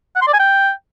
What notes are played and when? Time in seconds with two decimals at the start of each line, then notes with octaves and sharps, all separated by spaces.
0.16 F#5
0.22 C6
0.28 D5
0.34 G#5
0.40 G5